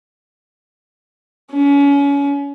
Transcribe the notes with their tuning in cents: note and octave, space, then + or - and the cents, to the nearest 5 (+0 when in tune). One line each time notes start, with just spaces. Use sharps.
C#4 +30